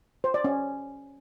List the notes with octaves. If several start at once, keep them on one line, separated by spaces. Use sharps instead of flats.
C5
D5
C#4